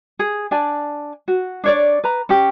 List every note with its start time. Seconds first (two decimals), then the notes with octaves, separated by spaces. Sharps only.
0.19 G#4
0.51 D4 D5 G#5 A5
1.28 F#4
1.64 D4 C#5 D5
2.04 B4 A#5
2.29 C#4 G4